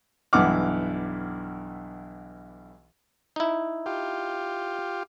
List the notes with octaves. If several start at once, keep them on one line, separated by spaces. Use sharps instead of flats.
B1 G2 E3 F#5 D6 F6
D#4 E4
F4 G4